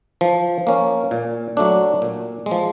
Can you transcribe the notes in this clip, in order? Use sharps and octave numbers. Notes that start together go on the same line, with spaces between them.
F3
A#3 C#4
A#2
F#3 A3 D4
A#2
G#3
F3